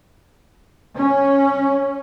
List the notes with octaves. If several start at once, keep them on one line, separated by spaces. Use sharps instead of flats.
C#4